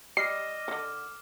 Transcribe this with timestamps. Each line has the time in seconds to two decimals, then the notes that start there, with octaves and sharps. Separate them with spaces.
0.17 G3 D#5 D6 F6 C7
0.68 D3 D#3